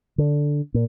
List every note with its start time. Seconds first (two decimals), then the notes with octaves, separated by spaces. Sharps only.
0.18 D3
0.74 A#2